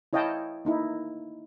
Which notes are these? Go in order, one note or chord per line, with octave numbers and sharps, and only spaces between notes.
E4 C#5 D#5 F5 G5 A5
A#3 D#4 E4